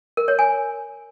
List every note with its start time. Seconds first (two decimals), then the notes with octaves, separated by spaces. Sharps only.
0.17 A#4
0.28 C#5
0.39 G#5